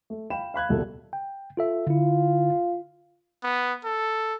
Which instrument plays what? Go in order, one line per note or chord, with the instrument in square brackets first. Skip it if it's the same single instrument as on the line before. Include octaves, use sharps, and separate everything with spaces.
[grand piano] A3
F5 G5 B5 E7
F5 B5 F#6 G#6
D#1 C2 B2 E4 A4
[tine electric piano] G5
F4 A4 E5
[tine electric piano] D3 E4 [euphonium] F4
[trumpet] B3
A4